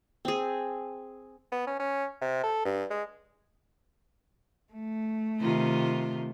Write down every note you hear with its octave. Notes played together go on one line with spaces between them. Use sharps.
C4 G#4
B3
C#4
C#4
C3
A4
G2
G#3
A3
C3 D#3 F4